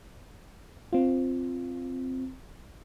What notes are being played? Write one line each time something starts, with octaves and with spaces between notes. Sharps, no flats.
C4 F4